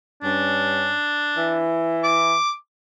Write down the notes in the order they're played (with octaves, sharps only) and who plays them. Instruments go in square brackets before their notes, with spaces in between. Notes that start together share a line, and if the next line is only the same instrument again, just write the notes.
[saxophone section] G2 C#4 [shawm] D4
[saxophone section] E3 E4
[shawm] D6